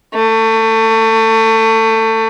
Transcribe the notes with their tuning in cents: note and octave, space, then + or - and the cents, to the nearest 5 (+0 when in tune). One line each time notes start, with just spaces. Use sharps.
A3 +25